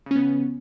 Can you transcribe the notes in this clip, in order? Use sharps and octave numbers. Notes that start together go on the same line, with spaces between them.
C#3 B3 C#4